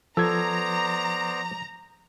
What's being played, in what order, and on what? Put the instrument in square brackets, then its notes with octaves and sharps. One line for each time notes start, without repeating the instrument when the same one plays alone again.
[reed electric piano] F3 G#6 [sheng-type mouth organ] B3 C5 D5 [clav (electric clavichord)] A4 [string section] A#5